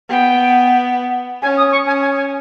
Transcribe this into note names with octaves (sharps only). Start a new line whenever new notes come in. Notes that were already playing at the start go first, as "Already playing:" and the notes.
B3 G5
C#4 G#5
D#6
C#6
C#4 G#5
G#5
G#5